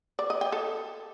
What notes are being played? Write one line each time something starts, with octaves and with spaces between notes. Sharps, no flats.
D5
D#5
G5
A4